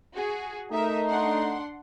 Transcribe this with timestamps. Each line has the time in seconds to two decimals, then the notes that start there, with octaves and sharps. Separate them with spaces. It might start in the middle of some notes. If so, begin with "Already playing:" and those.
0.14 F#4 G#4
0.72 A3 D#4 A#4 E5
1.07 D4 F#5 C6